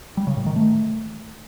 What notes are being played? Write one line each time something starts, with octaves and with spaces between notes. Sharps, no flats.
G3
C#3
A2
D#3
A3